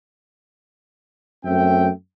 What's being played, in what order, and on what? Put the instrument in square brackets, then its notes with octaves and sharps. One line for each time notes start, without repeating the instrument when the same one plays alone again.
[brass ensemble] F#2 A3 C4 E5 G5